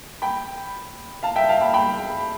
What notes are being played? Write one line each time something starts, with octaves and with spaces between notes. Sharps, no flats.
G5 B5
F5 A5
E5 G5
F5 A5
G5 B5
G5 B5